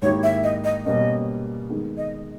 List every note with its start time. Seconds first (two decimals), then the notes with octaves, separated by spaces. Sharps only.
0.02 G#2 D#3 A#3 E4 G4 C#5
0.23 E5
0.43 D#5
0.64 D#5
0.85 B2 G3 A#3 C#4 D#5
1.69 D#3 G#3 B3
1.97 D#5